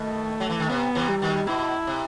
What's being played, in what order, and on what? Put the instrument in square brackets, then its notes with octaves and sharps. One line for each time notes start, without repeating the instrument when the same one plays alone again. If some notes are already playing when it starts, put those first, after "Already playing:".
Already playing: [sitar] B2 D#3 [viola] A3
[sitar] F#3
E3
D#3
[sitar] C3 [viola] B3
[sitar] C3 E3
[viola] G3
[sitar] B2 D#3
[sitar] B2 [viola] E4
[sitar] C3